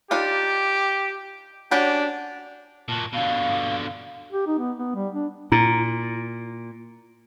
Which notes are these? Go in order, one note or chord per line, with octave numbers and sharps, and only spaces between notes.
D4 D#4 F4 G4
C#4 D4 F#4 G4
A#2 F#4 A5
B2 D3 F5
G4
D#4
B3
B3
G3
D4
A#2 E4